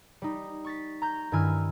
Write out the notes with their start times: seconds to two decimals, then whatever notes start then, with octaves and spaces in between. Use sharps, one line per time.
0.22 G3 D#4
0.65 C#6 A6 B6
1.02 A#5 G6
1.32 G2 D#3 E4 G#5 E6 F6